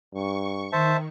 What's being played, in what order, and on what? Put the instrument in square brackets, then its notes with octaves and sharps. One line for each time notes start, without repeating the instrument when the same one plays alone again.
[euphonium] G2 [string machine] C#6
[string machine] D#3 [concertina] C5 E5 A5